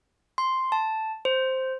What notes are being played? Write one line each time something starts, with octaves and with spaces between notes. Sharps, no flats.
C6
A5
C5